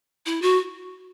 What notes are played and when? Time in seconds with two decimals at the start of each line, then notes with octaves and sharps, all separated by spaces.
0.26 E4
0.42 F#4